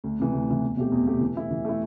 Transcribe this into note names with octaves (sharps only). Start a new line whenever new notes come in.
D2
C3 E3
D2
C3 E3
E2
B2 A3 C4 G4
E2
B2 A3 C4 G4
E3
A3 E4
E3
A3 E4